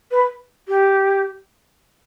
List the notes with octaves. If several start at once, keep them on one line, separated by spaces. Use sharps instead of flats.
B4
G4